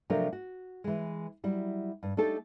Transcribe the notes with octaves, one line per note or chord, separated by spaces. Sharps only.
C3 F3 F#3 A3 D4 A#4
F#4
E3 G#3
F#3 G3 E4
G2
A3 D4 D#4 G4 A4